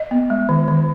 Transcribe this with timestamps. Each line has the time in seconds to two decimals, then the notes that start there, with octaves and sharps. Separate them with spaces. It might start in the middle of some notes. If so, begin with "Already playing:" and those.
Already playing: D#5
0.11 B3
0.30 G#3
0.49 D#3
0.68 D#3